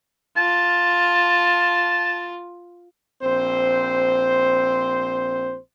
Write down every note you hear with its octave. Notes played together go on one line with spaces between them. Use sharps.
F4 A5
A#1 C4 C5